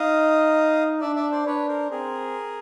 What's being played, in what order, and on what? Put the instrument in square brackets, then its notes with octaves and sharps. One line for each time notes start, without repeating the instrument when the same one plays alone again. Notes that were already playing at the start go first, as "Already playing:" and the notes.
Already playing: [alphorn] D#4 [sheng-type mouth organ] D#5 F5
[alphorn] D4 [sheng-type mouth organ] D5 E5
[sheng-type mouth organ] D5 E5
C5 D5
[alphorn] D4 [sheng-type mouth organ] B4 C#5
[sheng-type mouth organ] A#4 C5
[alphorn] C4 [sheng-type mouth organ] G#4 A#4